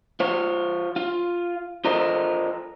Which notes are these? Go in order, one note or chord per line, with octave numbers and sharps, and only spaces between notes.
F4 C5 C#5
F4
F4 A4 A#4 C5 D#5